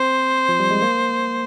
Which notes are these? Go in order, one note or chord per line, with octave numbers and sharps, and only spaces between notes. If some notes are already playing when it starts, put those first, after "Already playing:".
Already playing: C4 C5
F3
G3
G#3
A#3